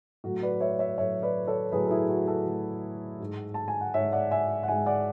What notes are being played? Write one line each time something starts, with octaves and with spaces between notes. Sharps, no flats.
A2 F#3 A3 F#4
B4 D5
C#5 E5
C#5 E5
A2 F#3 A3 C#5 E5
B4 D5
A4 C#5
A2 F#3 A3 G#4 B4
A4
E4 G#4
F#4
F#4 A4
A2 F#3 A3
G#2 G#3
A5
G#5
F#5
G#2 G#3 C#5 E5
D5 F#5
E5 G#5
F#5
G#2 G#3 E5 G#5
D5 F#5